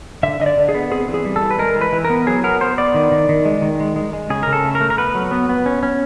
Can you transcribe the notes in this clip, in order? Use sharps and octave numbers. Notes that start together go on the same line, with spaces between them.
D3 E5
D3 D#5
D5
D3
G#4
B3
C4 G#4
E3
G#4
G3
A4
E3
B4
G#3 A#4
E3
B4
E3
A#4
B3
F#3 G#4
B3 A#4
B3 C5
B3 D5
D#3
D#3
D#3
G#3
D#3
G#3
G#3
G#3
C#3 G#4
A#4
C#3
A4
A3
A#4
A3
A#4
B3 B4
F#3
B3
B3
C#4
C#4